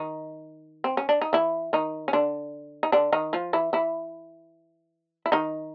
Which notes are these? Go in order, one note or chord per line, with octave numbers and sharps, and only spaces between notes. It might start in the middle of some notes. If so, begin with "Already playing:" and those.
Already playing: D#3 D#4
C4
C#4
D4
D#4
E3 E4
D#3 D#4
C#4
D3 D4
D#4
D3 D4
D#3 D#4
F3 F4
E3 E4
E3 E4
E4
D#3 D#4